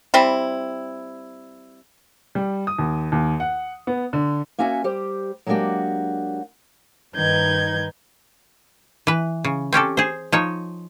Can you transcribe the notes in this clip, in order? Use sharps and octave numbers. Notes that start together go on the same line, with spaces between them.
G3 C4 E4
G3
D#6
D#2
D#2
F#5
B3
D3
A#3 C#4 F#4 E5 G5 G#5
G3 G4 C5
F#3 G#3 A#3 D4 F#4 G4
G2 D#3 D#4 B4 G6 G#6
E3 B4
C#3
C4 C#4 G4 A4
G#4 C5
F3 D#4 C#5